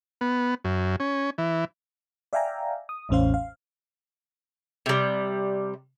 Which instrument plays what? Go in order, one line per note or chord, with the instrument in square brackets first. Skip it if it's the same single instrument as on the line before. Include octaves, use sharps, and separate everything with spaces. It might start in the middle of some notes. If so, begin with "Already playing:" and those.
[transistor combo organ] B3
F#2
C#4
E3
[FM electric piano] D5 E5 F5 G5 G#5 A#5
D#6
A1 E2 A2 C#4 C5 F5
F5
[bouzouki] C3 G3